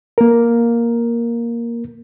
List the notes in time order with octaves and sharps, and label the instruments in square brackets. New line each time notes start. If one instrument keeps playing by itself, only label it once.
[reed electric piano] A#3 A#4